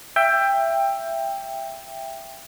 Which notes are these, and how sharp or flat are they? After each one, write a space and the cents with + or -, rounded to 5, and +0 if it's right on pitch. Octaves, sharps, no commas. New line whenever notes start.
E5 +15 G5 +15